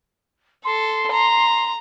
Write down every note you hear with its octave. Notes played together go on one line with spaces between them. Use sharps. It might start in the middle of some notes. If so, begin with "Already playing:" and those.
A4 C6
A#5